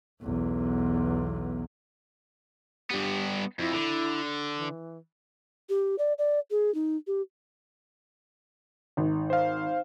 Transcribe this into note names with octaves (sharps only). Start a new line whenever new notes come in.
B1 E2
G2 B3 G4
F2 E4
D3
E3
G4
D5
D5
G#4
D#4
G4
G#1
C5 F5